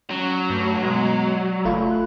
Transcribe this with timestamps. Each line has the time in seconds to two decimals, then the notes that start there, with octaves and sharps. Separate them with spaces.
0.10 F#3 C#4
0.50 G2 A3
0.83 B2 G#3
1.33 D5
1.65 F#1 A3 F4 B5
1.91 F#6